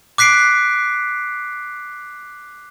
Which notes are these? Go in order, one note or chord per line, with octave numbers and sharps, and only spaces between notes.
D6 F#6 B6 C7 D7